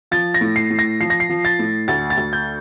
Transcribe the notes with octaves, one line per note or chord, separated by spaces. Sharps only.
F3 A6
A#6
A2
C7
A2
A#6
F3 C7
A#6
C7
F3
A6
A2
D2 A6
A6
D2
G6